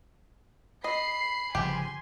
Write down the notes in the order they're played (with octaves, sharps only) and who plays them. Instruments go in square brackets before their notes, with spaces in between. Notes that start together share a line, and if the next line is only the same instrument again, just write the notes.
[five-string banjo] D#5 [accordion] B5 [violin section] C7
[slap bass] G1 C#3 F3 [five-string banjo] G4 [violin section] G#5 C6